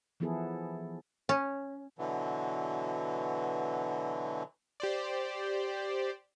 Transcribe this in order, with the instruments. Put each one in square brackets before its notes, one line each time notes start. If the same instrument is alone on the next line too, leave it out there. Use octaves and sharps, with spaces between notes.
[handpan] E3 F3 B3 E4 G#4 A4
[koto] C#4
[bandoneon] B2 D3 E3 F#3
[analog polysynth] G4 C5 D5